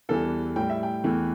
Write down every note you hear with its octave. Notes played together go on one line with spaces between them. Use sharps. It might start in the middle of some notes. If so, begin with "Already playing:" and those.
E2 E3 G3 A4
A2 G3 G5
E5
G5
E2 E3 A3